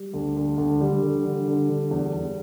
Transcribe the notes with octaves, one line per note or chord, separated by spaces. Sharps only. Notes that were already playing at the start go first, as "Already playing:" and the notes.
Already playing: G3
D2
D2
D2
D3 G3
D3
D3
D3
D3
E2
E2